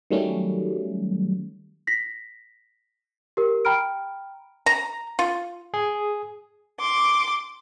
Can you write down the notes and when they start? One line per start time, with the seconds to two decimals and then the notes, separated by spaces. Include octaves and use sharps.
0.11 D#3 F#3 G3 A3 C#4
1.87 A#6 B6
3.37 G4 A#4
3.65 G5 A#5 B5 F6 D7
4.66 A#5
5.19 F4
5.74 G#4
6.79 C6 D6